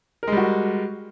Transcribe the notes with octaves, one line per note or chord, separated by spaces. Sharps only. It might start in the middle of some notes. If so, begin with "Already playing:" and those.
G3 G#3 F#4 A#4